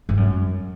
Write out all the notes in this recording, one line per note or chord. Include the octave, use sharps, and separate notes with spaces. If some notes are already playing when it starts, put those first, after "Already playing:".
G2
F#2